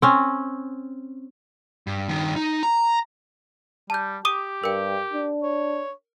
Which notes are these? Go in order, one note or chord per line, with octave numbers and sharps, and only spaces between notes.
C4 C#4
G2
G2 D#3
D#4
A#5
G3 A5 G6
G4 D6 D#6 D#7
G2 A#4 G5
D4
C#5